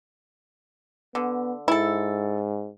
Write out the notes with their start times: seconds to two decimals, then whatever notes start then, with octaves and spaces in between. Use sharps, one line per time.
1.15 D3 B3
1.68 G#2 E4 A4